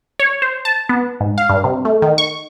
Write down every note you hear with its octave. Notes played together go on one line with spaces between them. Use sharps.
C#5
C5
A5
B3
G#2
F5
G2
C3
A3
D#3
C#6